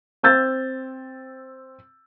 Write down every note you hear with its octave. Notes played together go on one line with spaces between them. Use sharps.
C4 E6 G6 A6